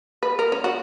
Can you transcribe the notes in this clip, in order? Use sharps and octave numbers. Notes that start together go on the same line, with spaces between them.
B4
A#4
C#4
F#4